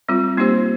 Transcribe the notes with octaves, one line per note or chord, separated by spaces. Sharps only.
G3 C4 F4
A#3 D#4 G4 C5